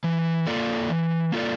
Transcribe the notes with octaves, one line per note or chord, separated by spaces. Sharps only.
E3
A#3 F4 A4 D5
E3
A#3 F4 A4 D5